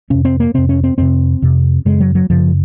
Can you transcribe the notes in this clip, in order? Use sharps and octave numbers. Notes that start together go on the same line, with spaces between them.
F2 C3 C#4
C4
A#3
F2 C3 C4
C#4
C4
F2 C3 C4
F2 C3
F#2 C#3 G#3
F#3
F#3
F#2 C#3 F3